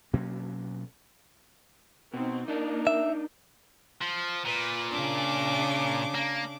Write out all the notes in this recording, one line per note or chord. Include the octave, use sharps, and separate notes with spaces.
B2 F#3 A#3 C#4
B2 C4 D#4
A#3 D4 D#4
E5
F3
A#2 B4
C#3 D4 D6
A#3